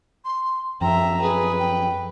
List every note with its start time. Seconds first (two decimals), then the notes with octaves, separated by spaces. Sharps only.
0.25 C6
0.81 F#2 F3 E5 G5 A#5
1.21 G#4 B4
1.59 G5